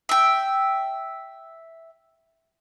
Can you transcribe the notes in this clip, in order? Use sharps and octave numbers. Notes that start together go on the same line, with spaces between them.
E5 G5